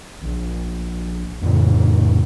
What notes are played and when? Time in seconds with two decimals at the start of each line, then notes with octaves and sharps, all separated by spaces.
0.22 A#1
1.41 F2 A2 C#3